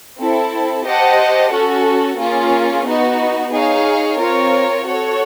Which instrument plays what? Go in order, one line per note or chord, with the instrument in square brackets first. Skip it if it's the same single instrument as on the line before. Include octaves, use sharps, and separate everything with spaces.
[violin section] C4 E4 A4
G4 C5 D#5 F#5 A5
C#4 F#4 A4
A#3 C#4 F4 G#4
B3 D#4 F#4
D#4 G#4 C#5 F5
C4 F4 A#4 C#5
F#4 A4 C#5